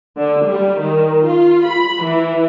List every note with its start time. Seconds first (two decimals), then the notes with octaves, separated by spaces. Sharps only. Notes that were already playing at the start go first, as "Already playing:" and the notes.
0.18 D3
0.48 G3
0.80 D#3
1.26 F4
1.66 B5
2.04 E3